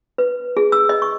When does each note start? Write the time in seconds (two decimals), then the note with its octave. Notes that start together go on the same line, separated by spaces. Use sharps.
0.18 B4
0.57 G#4
0.72 E6
0.89 D#5
1.02 C#6